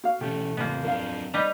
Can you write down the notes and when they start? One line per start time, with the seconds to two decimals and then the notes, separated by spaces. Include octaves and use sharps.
0.04 F#4 F5
0.21 B2 E3 A3 C#4 G4
0.57 F2 A2 C#3 A#3 B3
0.84 F#3 D4 A#4 F5
1.34 G3 B4 D#5 A#5